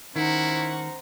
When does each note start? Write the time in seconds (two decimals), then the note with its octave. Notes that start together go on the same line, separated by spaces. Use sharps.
0.16 D#3 C#4 E4 C5 F#5 A#5 C#6